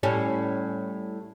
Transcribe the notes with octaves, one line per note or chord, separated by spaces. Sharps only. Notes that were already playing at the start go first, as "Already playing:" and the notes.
A2 G3 C#4